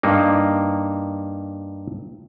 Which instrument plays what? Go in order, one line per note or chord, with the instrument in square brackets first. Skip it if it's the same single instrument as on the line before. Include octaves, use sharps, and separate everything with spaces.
[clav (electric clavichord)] G2 A#3 D#4